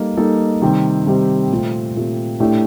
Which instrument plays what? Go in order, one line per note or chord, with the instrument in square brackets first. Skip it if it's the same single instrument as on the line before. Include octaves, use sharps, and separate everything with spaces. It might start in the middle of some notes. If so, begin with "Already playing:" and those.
Already playing: [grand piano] G3 A#3 D#4 A4 D#5
G3 A#3 D#4 A4 D#5
C3 D#3 G3 C4 G4
C3 D#3 G3 C4 G4
A#2 A3 C4 G4
A#2 A3 C4 G4
A2 A3 D4 G4